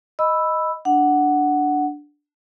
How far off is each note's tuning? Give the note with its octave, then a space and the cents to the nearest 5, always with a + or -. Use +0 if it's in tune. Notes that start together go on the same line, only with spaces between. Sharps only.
D#5 +0 B5 +0 E6 +0
D4 +0 F#5 +5